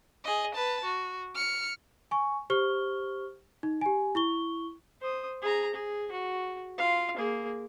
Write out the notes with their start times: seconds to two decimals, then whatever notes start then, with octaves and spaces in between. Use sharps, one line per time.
0.24 G#4 D#5
0.55 B4 A5
0.85 F#4
1.35 F6 C#7
2.11 G#5 C#6
2.50 G4 C5 C#6 F6 G7
3.63 D#4
3.81 G4 G#5
4.15 E4 C#6 G7
5.01 C5 D#6
5.42 G#4 A#5
5.74 G#4
6.12 F#4
6.78 F4 F5
7.17 A#3 G#4